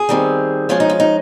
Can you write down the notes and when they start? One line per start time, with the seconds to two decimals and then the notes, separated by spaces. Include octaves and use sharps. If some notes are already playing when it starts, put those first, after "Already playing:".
Already playing: G#4
0.09 D#3 G3 C4
0.69 F3 G#3 C#4 F4
0.80 D#4
0.90 F4
1.00 D#4